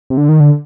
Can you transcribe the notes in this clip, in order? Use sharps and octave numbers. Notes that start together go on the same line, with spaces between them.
C3
D3
D#3
D3